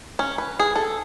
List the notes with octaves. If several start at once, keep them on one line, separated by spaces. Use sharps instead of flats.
C#4
B4
G#4
A4